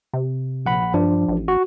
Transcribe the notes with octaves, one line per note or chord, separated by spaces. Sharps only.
C3
A#1 F#5 B5
G2 F3 D4
A1
F#4